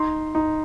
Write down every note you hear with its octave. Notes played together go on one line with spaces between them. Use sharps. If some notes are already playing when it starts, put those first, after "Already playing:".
Already playing: D#4 C6
D#4